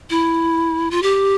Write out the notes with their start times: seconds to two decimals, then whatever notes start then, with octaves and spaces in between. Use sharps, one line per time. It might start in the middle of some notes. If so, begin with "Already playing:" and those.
0.10 E4
0.91 F4
1.02 G4